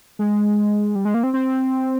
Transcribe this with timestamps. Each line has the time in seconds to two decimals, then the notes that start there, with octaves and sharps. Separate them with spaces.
0.19 G#3
0.95 G3
1.05 G#3
1.14 A#3
1.23 C4
1.34 C4